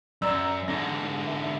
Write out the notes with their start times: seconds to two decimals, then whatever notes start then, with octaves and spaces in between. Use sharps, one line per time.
0.22 F#2 D5 A#5 E6
0.68 G#2 D3 A#6
1.27 E5